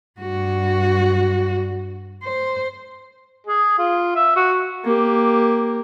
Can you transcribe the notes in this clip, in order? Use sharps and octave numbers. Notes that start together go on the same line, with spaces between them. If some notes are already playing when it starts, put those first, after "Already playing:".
G2 F#4
C5
G#4
F4
E5
F#4
A#3 G4